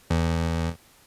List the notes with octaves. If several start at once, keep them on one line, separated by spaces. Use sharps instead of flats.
E2